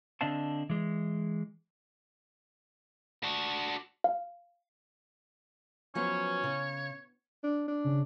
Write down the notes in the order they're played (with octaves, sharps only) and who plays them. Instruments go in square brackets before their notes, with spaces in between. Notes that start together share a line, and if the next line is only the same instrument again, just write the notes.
[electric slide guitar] D3 C4 D4 D#5 F5 A5
E3 G#3
[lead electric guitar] D4 F#4
[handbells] F5
[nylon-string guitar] F3 F#3 B3 [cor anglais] C#4 [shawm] C#5
[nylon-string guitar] C#3
[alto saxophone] D4
D4
[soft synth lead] C#3